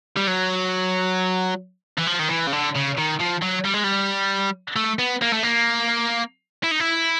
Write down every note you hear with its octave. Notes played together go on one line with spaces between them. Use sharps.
G3
F#3
E3
F3
D#3
E3
C#3
D3
C#3
D#3
F3
F#3
G3
G#3
G3
A3
B3
A#3
A3
A#3
E4
D#4
E4